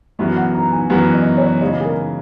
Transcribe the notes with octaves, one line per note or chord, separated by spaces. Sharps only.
F#2 E3 B3 F#4 E5
F#5
A#5
G#5
F#2 E3 B3 F#4 F#5
D#5
C#5
C#3 E3 G#3 D#5
G#4
A#4